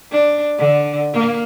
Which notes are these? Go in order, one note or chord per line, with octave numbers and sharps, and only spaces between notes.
D4
D3
A#3